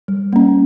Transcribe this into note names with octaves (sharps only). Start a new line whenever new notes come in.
G3
A#3 C#4